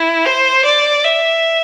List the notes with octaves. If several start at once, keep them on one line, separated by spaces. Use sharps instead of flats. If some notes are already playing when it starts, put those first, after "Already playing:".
Already playing: E4
C5
D5
E5